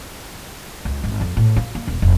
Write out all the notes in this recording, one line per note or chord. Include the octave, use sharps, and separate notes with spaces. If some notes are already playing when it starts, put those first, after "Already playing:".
C#2
G#1
F2
A2
F4
A#3
E1
F1